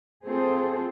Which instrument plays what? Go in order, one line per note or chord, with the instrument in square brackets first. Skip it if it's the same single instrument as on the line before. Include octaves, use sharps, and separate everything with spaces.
[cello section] C4 F4 G#4 A4 C5